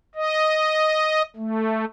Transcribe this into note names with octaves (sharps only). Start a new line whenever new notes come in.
D#5
A3